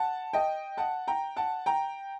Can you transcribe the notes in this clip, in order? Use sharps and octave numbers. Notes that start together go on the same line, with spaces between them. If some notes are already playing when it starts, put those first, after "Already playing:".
Already playing: F#5 A5
D#5 G5
F#5 A5
G5 A#5
F#5 A5
G5 A#5